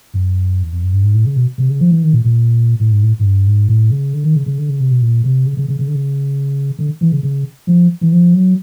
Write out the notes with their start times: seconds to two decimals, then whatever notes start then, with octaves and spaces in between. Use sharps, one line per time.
0.14 F#2
0.62 E2
0.72 F2
0.83 F#2
0.92 G2
1.03 G#2
1.14 A2
1.25 C#3
1.36 B2
1.58 C3
1.69 C#3
1.80 F3
1.91 E3
2.02 D#3
2.13 A#2
2.24 A#2
2.80 A2
2.91 G#2
3.02 A2
3.19 G#2
3.24 G2
3.46 G#2
3.68 A2
3.91 C#3
4.13 D3
4.24 D#3
4.35 C#3
4.46 C#3
4.57 D3
4.68 C#3
4.79 C3
4.90 B2
5.01 A#2
5.24 C3
5.45 C#3
5.57 C#3
5.68 C#3
5.79 C#3
5.87 D3
5.94 C#3
6.79 D3
7.01 E3
7.12 C#3
7.23 C#3
7.67 F3
8.01 E3
8.12 F3
8.34 F#3